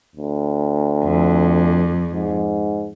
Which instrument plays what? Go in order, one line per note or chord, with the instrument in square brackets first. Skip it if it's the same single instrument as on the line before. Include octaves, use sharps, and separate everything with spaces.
[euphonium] D2
[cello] F2
[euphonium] G#2